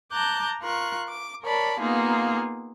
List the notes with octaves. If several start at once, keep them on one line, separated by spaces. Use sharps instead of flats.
A5 A#5 D6 F#6 G6
F4 A#4 C#6 F#6
D6
A#4 C#5 D5 A5 B5
A#3 B3 D#4 F4 G#4